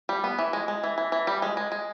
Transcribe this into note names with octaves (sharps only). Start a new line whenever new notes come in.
G3
B3
E3
G#3
G#3
E3
E3
E3
G3
G#3
G#3
G#3